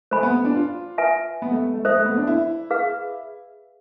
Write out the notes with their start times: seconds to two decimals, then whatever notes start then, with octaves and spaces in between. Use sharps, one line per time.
0.11 A3 C5 G#5 B5
0.23 B3
0.45 D4
0.55 F4
0.98 B4 E5 G#5
1.42 B3
1.51 A3
1.73 A3
1.85 A3 A4 C5 E5
1.95 A3
2.06 B3
2.17 D4
2.27 E4
2.70 G#4 B4 F5